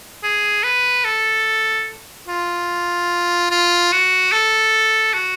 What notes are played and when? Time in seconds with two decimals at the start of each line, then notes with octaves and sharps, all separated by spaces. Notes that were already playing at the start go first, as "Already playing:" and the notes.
0.23 G#4
0.64 B4
1.04 A4
2.28 F4
3.50 F4
3.92 F#4
4.32 A4
5.14 F#4